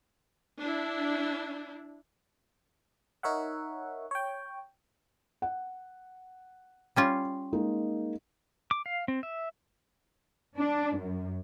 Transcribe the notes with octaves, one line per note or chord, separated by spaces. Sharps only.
D4 E4
D#4 A#4 C#5 E5 F#5
C#5 G5
F#5
G3 C#4 F4
G#3 A#3 D#4
D6
F5
C4
E5
D4
F#2